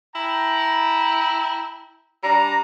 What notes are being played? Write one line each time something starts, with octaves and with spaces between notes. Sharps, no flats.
E4 G5 A5 A#5
G3 D4 A#5